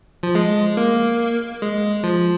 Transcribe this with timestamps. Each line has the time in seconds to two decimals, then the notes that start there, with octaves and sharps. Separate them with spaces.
0.23 F3
0.35 G#3
0.77 A#3
1.62 G#3
2.04 F3